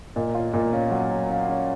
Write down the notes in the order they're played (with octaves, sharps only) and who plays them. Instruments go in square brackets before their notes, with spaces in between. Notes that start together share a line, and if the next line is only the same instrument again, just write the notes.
[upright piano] A#2 [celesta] D#5
[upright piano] F4 [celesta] C#5
[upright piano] A#2 [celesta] D#5
[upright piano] C#4 [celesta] F5
[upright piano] F#3 [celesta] F#5
[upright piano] C#4
[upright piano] C#4 [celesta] F5
[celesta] F#5
[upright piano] C#4